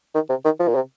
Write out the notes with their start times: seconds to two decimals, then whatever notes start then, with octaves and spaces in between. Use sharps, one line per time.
0.15 D#3
0.30 C3
0.45 D#3
0.60 F3
0.68 A#2
0.75 C3